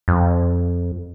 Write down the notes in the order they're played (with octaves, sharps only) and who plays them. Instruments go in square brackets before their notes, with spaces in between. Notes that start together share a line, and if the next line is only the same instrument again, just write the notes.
[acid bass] F2